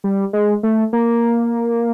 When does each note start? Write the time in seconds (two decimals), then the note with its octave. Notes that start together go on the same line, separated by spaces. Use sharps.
0.04 G3
0.33 G#3
0.63 A3
0.93 A#3